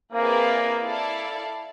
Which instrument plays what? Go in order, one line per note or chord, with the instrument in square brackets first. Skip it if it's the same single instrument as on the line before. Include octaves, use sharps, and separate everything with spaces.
[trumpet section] A#3 [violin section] C4 E4 G#4 B4 D5
[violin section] E4 A4 D5 F5 A5